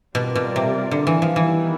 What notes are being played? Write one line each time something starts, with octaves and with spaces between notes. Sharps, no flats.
B2 G3 C4 F4 A#4 D5
B2
C3
D3
E3
F3
D#3 E3 G3 B3 E4